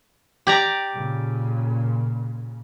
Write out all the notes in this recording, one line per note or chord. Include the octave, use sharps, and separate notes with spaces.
G4 D5 A#5
A#2 C#3